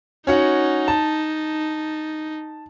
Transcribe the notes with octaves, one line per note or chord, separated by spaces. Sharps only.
C#4 D#4 F#4 F#5
A5